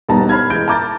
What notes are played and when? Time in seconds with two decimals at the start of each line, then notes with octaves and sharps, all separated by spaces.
0.09 E1 G3 B3 D#4 A5 A#5
0.29 C5 B5 F6 G#6
0.50 E3 G#3 G6 D7
0.68 A5 A#5 D6 G6 A6